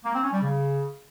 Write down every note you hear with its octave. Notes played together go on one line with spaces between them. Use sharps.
A#3
C4
C#4
G3
C#3